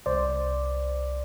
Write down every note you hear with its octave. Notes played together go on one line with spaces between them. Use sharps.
C2 C5 D5